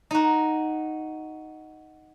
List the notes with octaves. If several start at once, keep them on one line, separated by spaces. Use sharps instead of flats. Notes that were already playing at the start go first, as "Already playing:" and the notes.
D#4 F#4